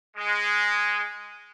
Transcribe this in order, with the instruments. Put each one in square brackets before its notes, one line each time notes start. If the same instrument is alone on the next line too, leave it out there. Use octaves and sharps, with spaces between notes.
[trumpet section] G#3